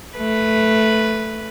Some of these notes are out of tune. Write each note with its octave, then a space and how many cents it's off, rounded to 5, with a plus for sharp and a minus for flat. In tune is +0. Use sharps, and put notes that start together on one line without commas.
A3 +0 B4 +0